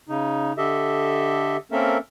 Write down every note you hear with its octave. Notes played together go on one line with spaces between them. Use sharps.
C#3 D#4
D3 G4 A4 D#5 E5
A#3 C4 C#4 A4 A#4 E5